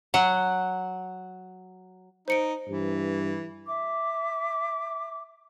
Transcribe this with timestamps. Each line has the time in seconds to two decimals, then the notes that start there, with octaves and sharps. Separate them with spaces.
0.14 F#3 F#5
2.28 D#4 C5 C#7 D7
2.69 G2 E3
3.67 E5 D6